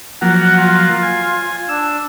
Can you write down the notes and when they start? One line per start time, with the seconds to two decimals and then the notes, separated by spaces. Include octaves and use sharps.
0.22 F3 F#3 A#3 F#5
0.59 F4
1.03 G#5
1.69 D4 E6